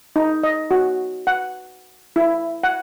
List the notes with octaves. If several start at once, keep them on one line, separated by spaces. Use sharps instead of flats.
D#4
D#5
F#4
F#5
E4
F#5